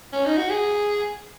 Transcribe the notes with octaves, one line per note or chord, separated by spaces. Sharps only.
C#4
D#4
F#4
G#4